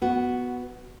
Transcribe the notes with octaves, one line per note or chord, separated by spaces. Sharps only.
B3 F#4